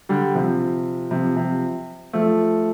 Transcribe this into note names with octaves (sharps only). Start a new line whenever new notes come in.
D3 G3
C3 F3
C3 F3
C3 F3
F3 A3